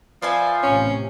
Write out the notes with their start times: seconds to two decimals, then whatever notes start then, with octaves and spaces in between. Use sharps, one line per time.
0.22 F3 B4 D5 E5 G#5
0.63 A1 C3 C#4